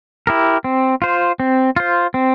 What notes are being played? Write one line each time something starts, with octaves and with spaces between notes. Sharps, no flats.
E4 G4 A#4
C4
F4 C5
C4
F4 C5
C4